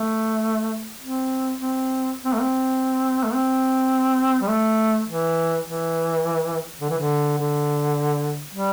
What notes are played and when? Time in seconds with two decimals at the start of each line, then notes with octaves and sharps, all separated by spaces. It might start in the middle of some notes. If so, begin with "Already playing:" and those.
Already playing: A3
1.01 C4
1.60 C4
2.25 C4
2.33 A3
2.41 C4
3.24 A3
3.33 C4
4.41 G3
4.49 A3
5.07 E3
5.65 E3
6.81 D3
6.90 E3
6.99 D3
7.39 D3
8.54 G3